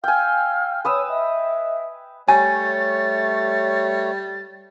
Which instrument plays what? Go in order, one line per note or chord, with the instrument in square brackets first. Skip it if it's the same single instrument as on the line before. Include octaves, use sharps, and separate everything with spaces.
[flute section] F5 E6 F6 [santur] G5 G#5
[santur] B4 D#6 E6 [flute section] C#5
[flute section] D#5 E5
[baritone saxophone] G3 [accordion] A3 C#5 [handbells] G#5 [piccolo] A6